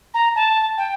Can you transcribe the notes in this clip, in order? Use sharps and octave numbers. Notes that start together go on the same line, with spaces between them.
A#5
A5
G5